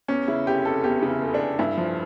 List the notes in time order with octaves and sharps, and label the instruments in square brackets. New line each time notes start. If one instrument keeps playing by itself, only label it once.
[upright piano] E2 C#4
C#3 E4
F1 G4
F1 A4
E2 G4
C#3
E4
F1
D4
F1
G2 E4
F3